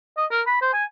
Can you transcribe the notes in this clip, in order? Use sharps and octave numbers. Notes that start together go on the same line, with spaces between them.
D#5
A#4
B5
C5
G#5